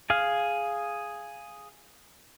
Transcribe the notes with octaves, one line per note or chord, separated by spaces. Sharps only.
G#4 F5 F6